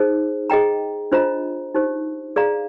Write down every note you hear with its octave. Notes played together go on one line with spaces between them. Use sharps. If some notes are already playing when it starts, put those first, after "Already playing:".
Already playing: D#4 G#4 C5
G#4 D#5 G5 A#5
D4 F4 C5 D#5 A#5
D#4 G4 C5
G#4 D5 F5 A#5